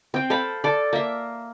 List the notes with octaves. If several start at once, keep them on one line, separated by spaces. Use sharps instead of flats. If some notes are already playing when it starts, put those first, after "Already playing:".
C4 G5
A4 C5 F5 B5
A4 D5
A#3 E5